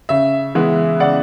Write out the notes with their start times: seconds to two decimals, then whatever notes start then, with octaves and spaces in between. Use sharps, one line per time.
0.09 C#3 E5
0.55 E3 G#3 B3
1.00 C#3 D5 F#5